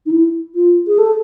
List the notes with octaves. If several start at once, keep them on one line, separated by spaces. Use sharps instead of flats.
D#4
E4
F4
G#4
A4